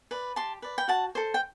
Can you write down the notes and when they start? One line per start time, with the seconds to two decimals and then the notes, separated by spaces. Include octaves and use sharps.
0.11 B4 D5
0.36 G4 A5 C6
0.62 B4 D5
0.78 G5
0.88 F#4 F#5 A5
1.15 A4 C5
1.34 G5